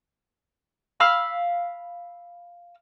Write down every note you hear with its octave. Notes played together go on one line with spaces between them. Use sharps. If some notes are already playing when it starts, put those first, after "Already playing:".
F5 B5 E6